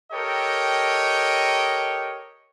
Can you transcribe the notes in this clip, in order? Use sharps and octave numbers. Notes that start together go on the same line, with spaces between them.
G4 A4 A#4 C#5 D#5 G5